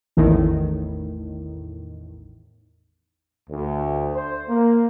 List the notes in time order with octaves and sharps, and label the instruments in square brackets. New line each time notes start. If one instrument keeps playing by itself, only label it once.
[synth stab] A1 E2 A2 D#3
[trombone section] D2
C5
A#3